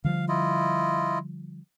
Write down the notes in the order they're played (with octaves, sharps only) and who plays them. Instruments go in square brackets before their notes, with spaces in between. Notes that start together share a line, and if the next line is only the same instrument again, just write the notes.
[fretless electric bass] D3 F3 G3 [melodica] F5
[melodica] E4 F4 D#5